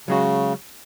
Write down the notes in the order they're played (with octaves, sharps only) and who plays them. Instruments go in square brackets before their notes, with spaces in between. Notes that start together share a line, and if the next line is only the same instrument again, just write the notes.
[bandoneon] C#3 [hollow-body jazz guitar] F#3 G#3 F#4